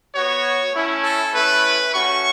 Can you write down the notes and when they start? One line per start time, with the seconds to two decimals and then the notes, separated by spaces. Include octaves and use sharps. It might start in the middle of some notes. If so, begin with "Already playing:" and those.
0.11 B3 F#4 C#5
0.72 A3 C#4 E4
1.02 A4
1.33 A3 C#4 E4 B4
1.93 A3 C#4 F#4 C#6